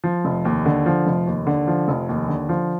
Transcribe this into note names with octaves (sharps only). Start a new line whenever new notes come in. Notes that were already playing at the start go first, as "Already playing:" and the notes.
F3
F1
D#2
D3
F3
F1
D#2
D3
F3
F1
D#2
D3
F3